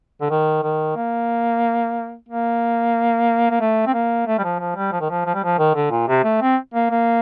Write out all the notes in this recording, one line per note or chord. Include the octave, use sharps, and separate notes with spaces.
D3
D#3
D#3
A#3
A#3
A#3
A3
C4
A#3
A3
G3
F3
F3
G3
F3
D#3
F3
F3
G3
F3
D#3
D3
A#2
C3
A3
C4
A#3
A#3